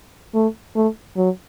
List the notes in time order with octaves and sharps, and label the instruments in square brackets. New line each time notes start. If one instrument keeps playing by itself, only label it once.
[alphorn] A3
A3
F#3